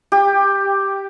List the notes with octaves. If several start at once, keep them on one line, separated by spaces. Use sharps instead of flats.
G4